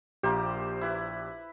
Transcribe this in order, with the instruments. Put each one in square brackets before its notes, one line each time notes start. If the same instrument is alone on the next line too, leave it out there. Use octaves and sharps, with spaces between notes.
[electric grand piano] A#1 G4 [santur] A#3 C5
[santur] E4 B4